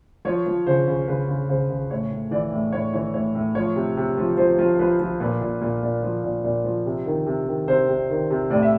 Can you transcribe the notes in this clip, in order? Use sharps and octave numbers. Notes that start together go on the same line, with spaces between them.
F3 C#5
F3
C#3 C5
C#3
C#3 B4
C#3
C#3 C5
C#3
A2 C#5
A2
E3 D5
A2
A2 C#5
E3 C#5
A2 C#5
A2
F3 C#5
C3
C3
F3
F3 C5
F3
F3 B4
F3
A#2 B4
A#2
A#2
A#2
F3
A#2
A#2
F3
C3
D#3
C3
D#3
C3 C5
C3
D#3
C3
A2 D5
E5